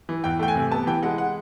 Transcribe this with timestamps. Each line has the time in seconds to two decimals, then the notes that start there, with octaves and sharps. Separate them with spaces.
0.09 E3
0.24 E2 G5
0.39 A3 G5
0.48 G#5
0.56 C3
0.71 B3 A5
0.87 E3 G5
1.03 G#3 F#5
1.18 F#5